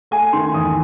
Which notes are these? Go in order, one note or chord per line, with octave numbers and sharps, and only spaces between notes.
A3 G#5
D#3 C6
E2 D#6